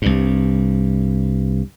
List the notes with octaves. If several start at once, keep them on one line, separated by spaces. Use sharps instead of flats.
C2 G2